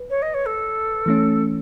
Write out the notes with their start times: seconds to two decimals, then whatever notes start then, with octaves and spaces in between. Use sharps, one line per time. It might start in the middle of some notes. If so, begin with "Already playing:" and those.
Already playing: B4
0.10 C#5
0.22 D#5
0.34 C#5
0.46 A4
1.06 E3 A3 C#4